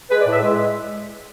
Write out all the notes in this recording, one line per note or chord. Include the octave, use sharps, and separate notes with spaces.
G#3 B4
D5
A2
E5
G#3